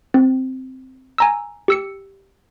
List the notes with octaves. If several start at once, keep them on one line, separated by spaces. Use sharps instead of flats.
C4
G#5 A#5 E6
G4 E6 C#7